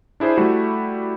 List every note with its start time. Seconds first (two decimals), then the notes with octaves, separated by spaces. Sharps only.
0.20 D4 E4 G#4 C5
0.37 G3 A3 E4 F#4